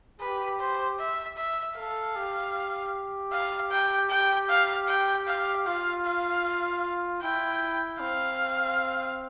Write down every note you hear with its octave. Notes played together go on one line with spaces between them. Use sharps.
G4 B4
C5
E5
E5
A4 F5
G4
F5
G5
G4 G5
F5
G5
F5
F4 F5
F5
E4 G5
C4 F5